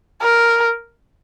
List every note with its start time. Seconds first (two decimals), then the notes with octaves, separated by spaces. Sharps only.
0.22 A#4